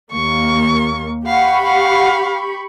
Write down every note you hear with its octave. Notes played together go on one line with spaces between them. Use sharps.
D#2 A#3 C#6
G4 F5 F#5 B5 C#6
F5